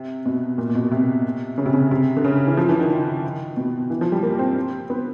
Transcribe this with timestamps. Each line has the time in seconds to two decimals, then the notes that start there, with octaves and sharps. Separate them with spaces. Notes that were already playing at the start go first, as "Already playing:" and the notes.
Already playing: C3
0.26 B2
0.58 A#2
0.69 A#2
0.75 B2
0.91 C3
1.58 C#3
1.66 C3
1.73 C#3
1.91 C3
2.17 D3
2.24 C#3
2.47 E3
2.57 F3
2.69 E3
2.79 D#3
2.90 D#3
3.57 B2
3.90 E3
4.01 F3
4.12 G3
4.23 A#3
4.39 C4
4.90 B3